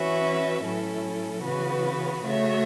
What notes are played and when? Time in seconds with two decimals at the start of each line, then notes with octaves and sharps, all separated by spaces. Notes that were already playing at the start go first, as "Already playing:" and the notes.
Already playing: E3 C#4 F#4 B4 E5
0.63 A2 F#3 C#4 E4 A4
1.43 C#3 E3 B3 F#4 B4
2.24 C#3 A3 F#4 C#5 E5